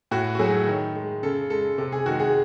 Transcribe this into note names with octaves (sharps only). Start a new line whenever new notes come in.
A2 F#4
F#4
F#3 A3 G#4
D#3
G#3
C#3 A4
G#3 A4
C3 A4
G#4
D#3 G#3 F#4
G#4